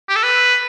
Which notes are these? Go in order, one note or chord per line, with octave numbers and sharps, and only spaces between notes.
G4
A4
B4